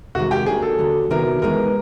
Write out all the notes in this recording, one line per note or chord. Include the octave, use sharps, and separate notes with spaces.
C3 D#3 G#3 F#4
G4
F#3 A#3 D4 G#4
A4
D#2 D3 F#3
C3 D#3 F#3 B3 E4 A#4
E3 G#3 B3 D#4 A#4